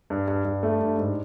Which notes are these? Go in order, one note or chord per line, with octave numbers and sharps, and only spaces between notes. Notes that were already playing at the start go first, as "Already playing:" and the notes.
G2
G2
G2
A3
G2
G#2